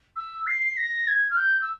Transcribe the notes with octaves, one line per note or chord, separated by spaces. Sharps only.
E6
C7
A#6
G#6
F6
G6
E6